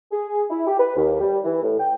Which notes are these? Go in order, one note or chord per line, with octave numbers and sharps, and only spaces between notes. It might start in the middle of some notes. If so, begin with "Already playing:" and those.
G#4
E4
G4
B4
D#2
G3
E3
A2
G5